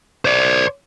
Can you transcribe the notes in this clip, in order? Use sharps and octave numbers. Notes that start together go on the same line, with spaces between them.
C5 D5